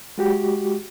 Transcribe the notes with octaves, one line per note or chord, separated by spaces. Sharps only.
G#3 F#4 G4